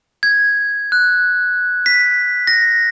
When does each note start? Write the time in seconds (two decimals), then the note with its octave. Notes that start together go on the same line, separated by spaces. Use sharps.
0.23 G#6
0.92 F#6
1.86 B6
2.47 A#6